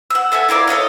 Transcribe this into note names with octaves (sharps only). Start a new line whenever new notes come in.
F#5 E6
A4 E5 F#5 G#5
E4 F4 A#4 D5
A4 C#5 D#5 F5